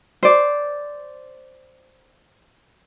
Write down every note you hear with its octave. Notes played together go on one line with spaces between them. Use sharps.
C5 D5